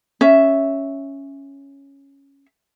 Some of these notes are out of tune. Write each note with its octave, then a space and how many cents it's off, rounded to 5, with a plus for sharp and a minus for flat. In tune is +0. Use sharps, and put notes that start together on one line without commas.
C#4 +0 E5 +0